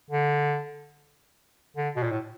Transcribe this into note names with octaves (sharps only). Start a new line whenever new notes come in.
D3
D3
B2
A#2
A2